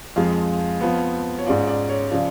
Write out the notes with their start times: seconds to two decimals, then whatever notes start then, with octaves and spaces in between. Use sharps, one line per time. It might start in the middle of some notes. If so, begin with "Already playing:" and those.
0.16 F2 F3 G#3 F5
0.80 F2 F3 B3
1.39 C#5
1.46 G#2 G#3 C#4 F4 D5
1.67 D5
1.89 C#5
2.11 C#3 F3 D5